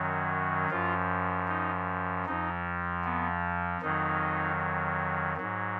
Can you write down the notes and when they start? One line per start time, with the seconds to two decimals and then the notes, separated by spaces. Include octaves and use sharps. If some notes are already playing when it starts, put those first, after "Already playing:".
Already playing: F#2 D#3 F#3
0.70 F#2 F3 F4
1.48 D#4
2.26 F2 F3 D#4
3.04 B3
3.81 F2 D#3 F#3 D#4
5.37 G#2 F#3